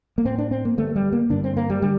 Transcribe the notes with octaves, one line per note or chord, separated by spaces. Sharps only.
A#3
A2 C4
D4
C4
A#3
G2 D3 A3
G3
A#3
G2 D3 D4
C4
A#3
G3
D3 G3